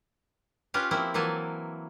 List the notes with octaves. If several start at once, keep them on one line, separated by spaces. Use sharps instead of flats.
C#4 F4 G4 B4 F5
F3 A#3 C4 E4
E3 F#3 A#3 G#5 A5